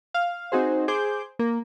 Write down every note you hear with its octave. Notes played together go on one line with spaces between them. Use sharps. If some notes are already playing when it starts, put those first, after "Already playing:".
F5
C4 D#4 F#4 G#4 C5
G#4 C5 D6 G6
A#3